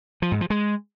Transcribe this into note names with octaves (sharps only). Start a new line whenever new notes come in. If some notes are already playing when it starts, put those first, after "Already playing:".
F3
G#2
F3
G#3